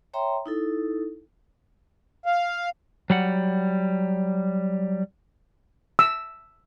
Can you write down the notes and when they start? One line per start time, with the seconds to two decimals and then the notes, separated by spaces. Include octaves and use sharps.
0.14 C#5 E5 G5 A#5 C6
0.46 D#4 E4 A4
2.26 F5
3.10 F#3 G3 F#5
5.99 E6